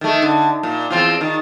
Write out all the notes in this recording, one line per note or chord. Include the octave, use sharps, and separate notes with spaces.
D#3 A3
D3
A#2
E2 C4 F4
D#3